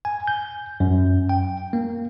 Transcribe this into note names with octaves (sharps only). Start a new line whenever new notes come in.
G#5
G6
F#2
G5
A#3